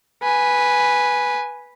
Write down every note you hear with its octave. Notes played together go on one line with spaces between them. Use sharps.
B4 G#5